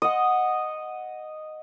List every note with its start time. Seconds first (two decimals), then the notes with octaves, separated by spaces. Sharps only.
0.02 D#5 F#5